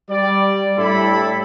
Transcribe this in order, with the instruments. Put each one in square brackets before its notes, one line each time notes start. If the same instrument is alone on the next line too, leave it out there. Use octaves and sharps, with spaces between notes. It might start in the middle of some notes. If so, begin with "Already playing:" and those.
[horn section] G3 D5
A2 G3 D4 E4 A4 B5